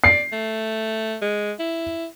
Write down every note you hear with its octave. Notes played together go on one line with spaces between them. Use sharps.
D5 C7
A3
G#3
E4